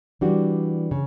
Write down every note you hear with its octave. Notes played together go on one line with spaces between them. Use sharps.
E3 G3 D4 F#4
C#3